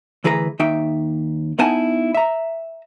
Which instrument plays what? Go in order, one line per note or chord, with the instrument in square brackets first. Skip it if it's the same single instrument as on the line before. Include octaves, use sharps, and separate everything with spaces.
[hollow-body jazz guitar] D2 E3 G#4 B4 C5 A#5
D#2 D#4 E5 G5
B3 D#4 E4 F#5 G#5 A5
E5 A#5